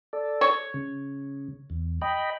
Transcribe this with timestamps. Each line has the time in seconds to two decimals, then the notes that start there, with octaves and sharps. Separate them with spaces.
0.13 A4 D5
0.41 C#5
0.74 C#3
1.70 E2
2.01 D#5 G5 B5